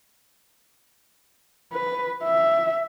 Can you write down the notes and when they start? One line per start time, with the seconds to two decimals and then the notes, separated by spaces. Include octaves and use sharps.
1.73 B4
2.24 E5